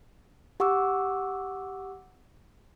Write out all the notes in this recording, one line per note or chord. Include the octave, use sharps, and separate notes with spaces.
G4 F#5 C#6 D6 E6